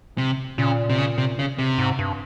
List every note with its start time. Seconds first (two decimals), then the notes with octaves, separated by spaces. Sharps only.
0.18 C3
0.58 A#2 C#3
0.90 C3
0.98 C#3
1.18 C3
1.39 C#3
1.59 C3
1.78 G#2
1.99 G2